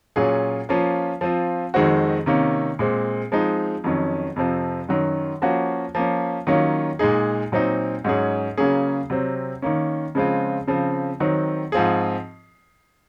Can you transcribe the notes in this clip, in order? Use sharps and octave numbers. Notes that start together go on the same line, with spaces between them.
A#2 F#3 C#4 F4 G#4
F3 A#3 C#4 F4
F3 C4 F4
F2 D#3 G#3 C4 F#4
C3 D#3 A#3 C#4
A#2 G#3 C4
F3 G#3 C4 D#4
F2 D#3 F#3 C#4
F2 C3 F3 C4
F#2 D#3 F#3
F3 A#3 C#4 F#4
F3 A#3 C#4
D#3 F#3 A#3 C#4 F4
A#2 G#3 D#4 G#4
A#2 F#3 C4 D#4
G#2 F#3 C#4 G#4
C#3 F#3 A#3 C#4 G#4
C3 F#3 C4
D#3 A#3 C#4
C#3 F3 G#3 C4 F4
C#3 F3 C4
D#3 F#3 C4
G#2 F3 C4 F4 G#4